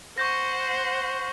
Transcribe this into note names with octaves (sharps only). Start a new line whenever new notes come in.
C5 F#5 C#6 G6 A#6